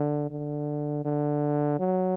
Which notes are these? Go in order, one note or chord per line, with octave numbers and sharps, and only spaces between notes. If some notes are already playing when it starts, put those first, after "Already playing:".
Already playing: D3
D3
D3
F#3